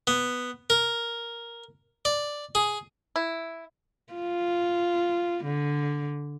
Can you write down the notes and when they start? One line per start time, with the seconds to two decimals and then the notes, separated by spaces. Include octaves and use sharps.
0.07 B3
0.70 A#4
2.05 D5
2.55 G#4
3.16 E4
4.14 F4
5.45 D3